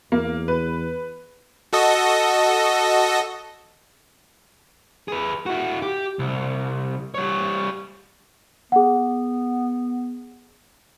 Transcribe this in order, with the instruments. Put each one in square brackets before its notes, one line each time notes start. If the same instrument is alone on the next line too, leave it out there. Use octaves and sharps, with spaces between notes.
[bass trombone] E2 [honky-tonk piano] A#3
[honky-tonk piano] B4
[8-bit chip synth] F#4 A4 D#5
[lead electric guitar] G#4 B4
E4 F#4
G4
C2
G3 C#5
[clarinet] B3 [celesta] G#4 F#5